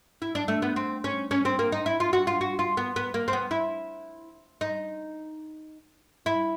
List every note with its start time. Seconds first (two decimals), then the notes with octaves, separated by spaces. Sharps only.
0.22 E4
0.35 D4
0.48 A3
0.62 B3
0.76 C4
1.04 C#4
1.31 C#4
1.45 C4
1.59 A#3
1.72 D#4
1.86 E4
2.00 F4
2.13 F#4
2.27 F4
2.41 F#4
2.59 F4
2.77 B3
2.96 B3
3.14 A#3
3.28 C4
3.33 B3
3.51 E4
4.61 D#4
6.26 E4